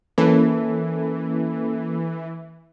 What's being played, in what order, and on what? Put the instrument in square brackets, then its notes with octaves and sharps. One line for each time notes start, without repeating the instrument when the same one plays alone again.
[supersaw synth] E3 [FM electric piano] A#3 C#4 A4